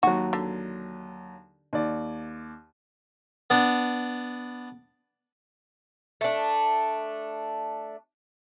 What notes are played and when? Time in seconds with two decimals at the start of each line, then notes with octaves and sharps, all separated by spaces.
0.03 D#2 F#3 F#4
0.33 D3
1.73 D#2 D5
3.50 B3 D4
6.21 A3 D4